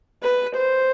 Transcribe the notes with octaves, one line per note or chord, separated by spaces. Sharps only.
B4
C5